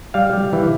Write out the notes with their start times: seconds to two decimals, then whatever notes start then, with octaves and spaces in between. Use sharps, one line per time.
0.14 G3 F5
0.33 G3
0.53 E3